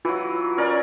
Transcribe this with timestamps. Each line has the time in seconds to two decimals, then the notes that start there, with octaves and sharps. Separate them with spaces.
0.05 E3 F#3 F4
0.57 C#4 A#4 D5